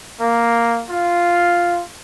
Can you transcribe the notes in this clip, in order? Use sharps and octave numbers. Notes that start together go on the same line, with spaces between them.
A#3
F4